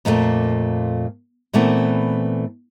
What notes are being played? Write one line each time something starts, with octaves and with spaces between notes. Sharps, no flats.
F2 A#2 E3 G3 A3 A#3
A#2 E3 A3 B3 C4